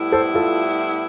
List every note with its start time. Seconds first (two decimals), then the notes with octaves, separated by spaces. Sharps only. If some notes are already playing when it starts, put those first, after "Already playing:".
Already playing: A2 G3 B3 E4
0.12 A4 C5
0.34 F4 A4